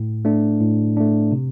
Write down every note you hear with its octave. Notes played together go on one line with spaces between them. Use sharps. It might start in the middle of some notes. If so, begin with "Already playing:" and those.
Already playing: A2
A3 D4
A2
A3 D4
C3